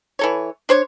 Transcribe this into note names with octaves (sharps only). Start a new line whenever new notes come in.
E3 A4 C#5
D4 C5 C#5